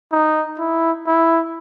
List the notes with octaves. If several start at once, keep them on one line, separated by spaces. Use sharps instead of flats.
D#4
E4
E4